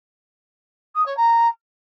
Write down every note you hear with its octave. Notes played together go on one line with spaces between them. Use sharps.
D#6
C#5
A#5